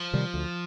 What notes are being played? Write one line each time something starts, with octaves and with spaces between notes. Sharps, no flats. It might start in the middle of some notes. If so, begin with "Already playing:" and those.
Already playing: F3
C3 D#3 G3
D2